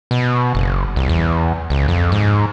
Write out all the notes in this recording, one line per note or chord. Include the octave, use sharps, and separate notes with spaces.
B2
F#1
C2
E2
C#2
F2
G#2